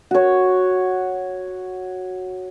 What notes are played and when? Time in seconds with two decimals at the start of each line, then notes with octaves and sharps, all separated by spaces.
0.11 F#4 C#5